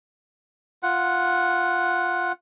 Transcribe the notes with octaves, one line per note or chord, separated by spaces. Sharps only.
F4 F#5